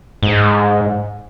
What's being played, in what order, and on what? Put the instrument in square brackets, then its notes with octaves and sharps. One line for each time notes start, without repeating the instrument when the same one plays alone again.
[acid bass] G#2